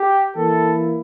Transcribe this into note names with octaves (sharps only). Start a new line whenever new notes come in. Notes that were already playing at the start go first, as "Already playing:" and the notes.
Already playing: G4
E3 A#3 E4 A4